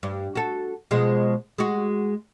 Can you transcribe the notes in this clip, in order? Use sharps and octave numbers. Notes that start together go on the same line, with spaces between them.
G2
F#4 A4
B2 F3 G#3
G#3 F#4